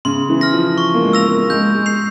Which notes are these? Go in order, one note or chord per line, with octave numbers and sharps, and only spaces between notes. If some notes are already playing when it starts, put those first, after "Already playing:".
C#3 C6
E3
F6 A#6
F3
C#6
A#3
G#3
E6 A#6 F7
A#3
G#3 G6
G#3
C7 F7